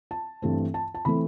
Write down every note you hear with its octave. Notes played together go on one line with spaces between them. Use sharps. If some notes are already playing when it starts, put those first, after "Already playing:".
A5
G2 E3 A3 C4
A5
A5
E3 A3 C4 B5